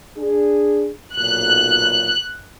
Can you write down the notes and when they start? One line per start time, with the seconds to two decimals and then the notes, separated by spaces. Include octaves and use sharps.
0.18 D4 G#4
1.15 B1 A#2 F#6